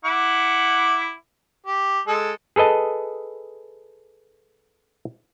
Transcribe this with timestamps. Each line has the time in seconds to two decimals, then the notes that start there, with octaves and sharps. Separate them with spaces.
0.05 E4 F#5 D6
1.66 G4
2.08 G#3 A4
2.56 G#4 A4 B4 D#5 A5